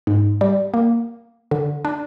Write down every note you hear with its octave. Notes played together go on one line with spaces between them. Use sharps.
G#2
G3
A#3
D3
D4